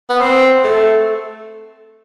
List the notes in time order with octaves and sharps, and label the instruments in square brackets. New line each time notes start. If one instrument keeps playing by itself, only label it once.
[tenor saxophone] B3
C4
A3